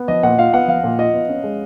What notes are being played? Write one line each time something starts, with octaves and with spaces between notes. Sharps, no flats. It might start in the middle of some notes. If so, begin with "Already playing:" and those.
Already playing: B3
F3 D#5
A#2 F#5
F4 F5
B3 F#5
F3 F5
A#2
F4 D#5
B3
C#4
G#3